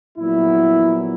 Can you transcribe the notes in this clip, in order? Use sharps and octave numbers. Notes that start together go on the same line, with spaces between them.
A#1 A#2 F#3 B3 E4